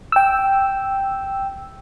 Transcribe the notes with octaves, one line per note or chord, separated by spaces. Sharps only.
G5 E6